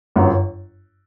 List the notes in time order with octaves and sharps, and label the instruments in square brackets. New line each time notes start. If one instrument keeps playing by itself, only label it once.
[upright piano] G1 F#2 F#3